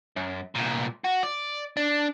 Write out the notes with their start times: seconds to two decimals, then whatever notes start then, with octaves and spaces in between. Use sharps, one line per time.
0.17 F#2
0.56 C2 A#2
1.05 F#4
1.23 D5
1.77 D4